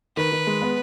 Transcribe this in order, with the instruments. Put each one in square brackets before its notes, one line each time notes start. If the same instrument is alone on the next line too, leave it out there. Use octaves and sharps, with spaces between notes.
[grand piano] D#3 [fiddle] B4
[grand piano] D#3
G#3
B3